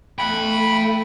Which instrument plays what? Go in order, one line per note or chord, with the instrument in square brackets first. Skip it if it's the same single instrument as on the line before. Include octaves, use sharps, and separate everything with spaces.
[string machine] A3 [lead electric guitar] F5 G5 [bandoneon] B5